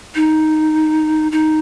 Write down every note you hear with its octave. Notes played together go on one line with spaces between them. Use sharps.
D#4
D#4